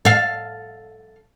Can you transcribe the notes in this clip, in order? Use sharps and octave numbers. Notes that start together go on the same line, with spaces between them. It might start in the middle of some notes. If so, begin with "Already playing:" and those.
A4 F5